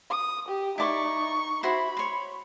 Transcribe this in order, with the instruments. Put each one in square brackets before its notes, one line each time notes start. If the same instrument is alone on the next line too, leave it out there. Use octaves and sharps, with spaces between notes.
[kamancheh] D#6
G4
[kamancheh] D#4 C#6 [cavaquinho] E4 D5
[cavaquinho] E4 F#4 C5 [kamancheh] B5
[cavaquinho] C#5 C6